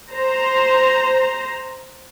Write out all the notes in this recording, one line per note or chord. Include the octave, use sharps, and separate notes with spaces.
C5 A#5